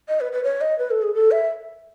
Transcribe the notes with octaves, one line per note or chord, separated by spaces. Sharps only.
D#5
B4
B4
C#5
D#5
B4
A4
G#4
A4
E5